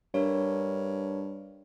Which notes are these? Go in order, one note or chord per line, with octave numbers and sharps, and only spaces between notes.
G2 D4 A#4 C#5